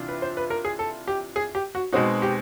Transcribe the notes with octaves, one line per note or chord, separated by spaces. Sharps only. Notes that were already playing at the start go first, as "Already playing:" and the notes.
Already playing: C3 E3 D4 F4
B4
C5
B4
A#4
G#4
A4
G4
G#4
G4
F#4
B2 G#3 C4 D#4 F#4
G4